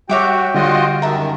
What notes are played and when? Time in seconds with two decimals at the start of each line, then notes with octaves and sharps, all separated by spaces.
0.09 G3 F#4 C#5 E5 G5 D6
0.54 D3 G3 F4 F#4 D#5
1.02 F#2 D#3 A#4 E5 A5